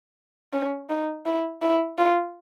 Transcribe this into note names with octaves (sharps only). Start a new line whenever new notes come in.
C#4
D#4
E4
E4
F4